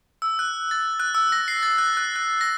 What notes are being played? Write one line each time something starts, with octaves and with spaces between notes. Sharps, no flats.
E6
F#6
A6
F#6
E6
A#6
C7
A6
F#6
F#6
F#6
A#6